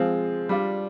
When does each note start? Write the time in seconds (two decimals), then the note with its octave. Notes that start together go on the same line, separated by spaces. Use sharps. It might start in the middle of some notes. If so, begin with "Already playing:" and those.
Already playing: F3 G#3 C4 F4
0.49 G3 D4 F4